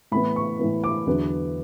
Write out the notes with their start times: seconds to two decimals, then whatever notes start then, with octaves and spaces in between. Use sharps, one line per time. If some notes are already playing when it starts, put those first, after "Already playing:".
0.12 A2 E3 B3 B5
0.36 C#6
0.59 A2 E3 B3
0.84 D6
1.07 E2 D3 F#3 B3 D4